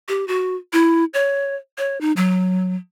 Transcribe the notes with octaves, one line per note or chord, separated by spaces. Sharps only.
G4
F#4
E4
C#5
C#5
D#4
F#3